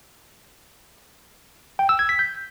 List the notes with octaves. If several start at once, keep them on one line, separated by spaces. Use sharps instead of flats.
G5
E6
G#6
B6
G6